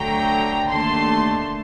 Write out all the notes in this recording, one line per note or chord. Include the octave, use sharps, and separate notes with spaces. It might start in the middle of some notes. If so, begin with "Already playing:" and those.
Already playing: D2 D3 F#3 A3 G5 A#5
D#2 D3 A3 A5 C6